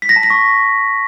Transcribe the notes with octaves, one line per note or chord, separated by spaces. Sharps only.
B6
A#6
A5
A#6
C#6